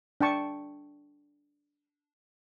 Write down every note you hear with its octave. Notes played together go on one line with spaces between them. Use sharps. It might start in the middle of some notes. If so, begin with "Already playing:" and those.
D4 G5 A5 C#6